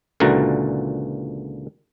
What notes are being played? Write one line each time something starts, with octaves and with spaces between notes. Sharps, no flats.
C#2 A#2 D3 E3 F#4 A#5